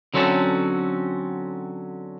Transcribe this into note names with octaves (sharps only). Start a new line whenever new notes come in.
D3 F#3 C4 C#4 F#4 A4